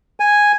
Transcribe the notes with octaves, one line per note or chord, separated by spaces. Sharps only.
G#5